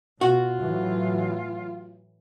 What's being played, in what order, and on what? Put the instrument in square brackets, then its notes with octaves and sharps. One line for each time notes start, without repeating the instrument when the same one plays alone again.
[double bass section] B2 [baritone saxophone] F4 [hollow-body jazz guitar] F#4
[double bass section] A2 E3 F#3